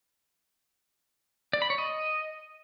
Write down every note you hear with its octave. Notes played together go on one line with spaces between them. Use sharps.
D5
B5
C#5
D#5